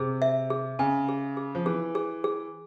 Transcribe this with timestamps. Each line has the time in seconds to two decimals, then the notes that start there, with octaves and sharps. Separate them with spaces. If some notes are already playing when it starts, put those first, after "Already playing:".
Already playing: C3 G#4
0.22 E5
0.50 G#4
0.79 C#3 G#5
1.09 G#4
1.37 G#4
1.55 F3
1.66 E3 G#4
1.95 G#4
2.24 G#4